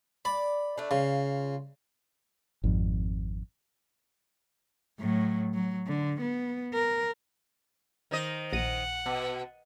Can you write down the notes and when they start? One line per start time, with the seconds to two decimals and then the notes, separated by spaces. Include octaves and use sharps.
0.25 D5 B5
0.77 A3 D4
0.91 C#3 F4
2.64 G#1 F2
4.99 A2 F#3
5.54 F#3
5.87 D3
6.21 B3
6.74 A#4
8.11 D#3 C5 D#5
8.53 A#1 F#5 A#6 D#7
9.06 B2